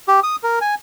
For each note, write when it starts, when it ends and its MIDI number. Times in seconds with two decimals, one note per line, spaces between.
0.08 0.20 67
0.23 0.36 87
0.43 0.59 70
0.61 0.75 80